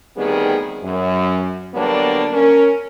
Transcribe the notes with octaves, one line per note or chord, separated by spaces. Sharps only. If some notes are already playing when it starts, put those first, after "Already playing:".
D2 D#3 G3 B3 C4 G#4
F#2
D3 F#3 G3 A#3 B3 D4
C#4 A#4